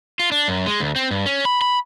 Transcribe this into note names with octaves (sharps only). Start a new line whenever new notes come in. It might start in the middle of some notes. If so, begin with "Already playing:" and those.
F4
D4
F#2
G#3
D2
C4
G2
C#4
B5
B5